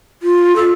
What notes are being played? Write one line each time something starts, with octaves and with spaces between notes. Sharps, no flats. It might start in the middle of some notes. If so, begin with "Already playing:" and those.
F4
A4